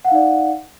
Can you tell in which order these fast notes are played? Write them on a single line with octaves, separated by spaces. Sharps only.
F#5 F5 D#4 D5